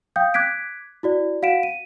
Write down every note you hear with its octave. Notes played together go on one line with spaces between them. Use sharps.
F5 G5 D#6 G6
D6 F#6 G#6 B6 D7
E4 F#4 D5
F#4 F5 F#5 B6 D7 E7
D#7